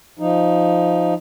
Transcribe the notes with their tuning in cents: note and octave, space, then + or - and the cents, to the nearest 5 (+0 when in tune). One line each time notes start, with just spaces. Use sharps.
F3 +0 D#4 +0